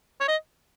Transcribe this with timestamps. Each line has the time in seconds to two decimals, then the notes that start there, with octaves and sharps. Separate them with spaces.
0.21 C#5
0.28 D#5